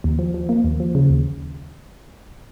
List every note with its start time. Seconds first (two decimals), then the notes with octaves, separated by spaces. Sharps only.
0.04 D#2
0.19 F3
0.34 F3
0.49 A#3
0.64 D#2
0.80 F3
0.95 C#3
1.10 D#2